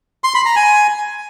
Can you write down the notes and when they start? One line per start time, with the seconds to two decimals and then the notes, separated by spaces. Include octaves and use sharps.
0.24 C6
0.35 B5
0.45 A#5
0.56 G#5